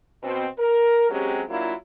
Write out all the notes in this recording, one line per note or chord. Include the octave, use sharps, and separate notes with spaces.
B2 C4
A#4
F#3 G#3 C4 C#4 G4
F#3 A#3 D4 E4 F4